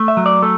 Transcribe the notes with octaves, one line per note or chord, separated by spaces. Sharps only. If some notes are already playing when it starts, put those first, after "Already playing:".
Already playing: A3
E5
F#3
D5
A3 A4